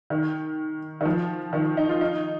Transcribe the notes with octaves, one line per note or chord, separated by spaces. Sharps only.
D#3
D#3
F3
D#3
D#4
F4
D#4